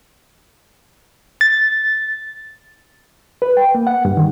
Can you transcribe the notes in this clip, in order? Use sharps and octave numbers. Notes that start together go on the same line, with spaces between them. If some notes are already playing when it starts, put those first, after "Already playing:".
A6
B4
G5
A#3
F#5
G2
D#3